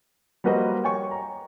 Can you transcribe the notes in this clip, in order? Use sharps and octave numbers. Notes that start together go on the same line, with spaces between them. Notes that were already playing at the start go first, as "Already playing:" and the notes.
G3 A#3 F#4 B4 C5 D#5
C#5 G5 G#5 C#6
A#5